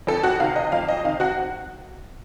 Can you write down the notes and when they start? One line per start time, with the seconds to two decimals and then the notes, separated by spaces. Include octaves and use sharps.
0.07 F2 A4 A5
0.23 F#4 F#5
0.40 C3 D#3 F5
0.56 D#5
0.72 F2 F5
0.88 D#5
1.04 C3 D#3 F5
1.20 F#4 F#5